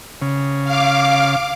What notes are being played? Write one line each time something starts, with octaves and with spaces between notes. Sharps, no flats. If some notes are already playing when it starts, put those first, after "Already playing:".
C#3
F5 D6